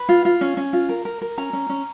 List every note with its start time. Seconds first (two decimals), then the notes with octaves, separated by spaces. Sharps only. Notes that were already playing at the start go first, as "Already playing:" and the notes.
Already playing: B4
0.09 F4
0.25 F4
0.41 C#4
0.57 C#4
0.73 F4
0.89 A#4
1.05 A#4
1.22 A#4
1.38 C#4 A#5
1.53 C#4
1.69 C#4